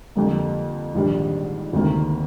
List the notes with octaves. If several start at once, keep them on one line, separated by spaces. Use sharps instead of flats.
F2 D3 G3 A#3
A#1 G#2 D#3 G3 D4
D2 C3 D#3 A#3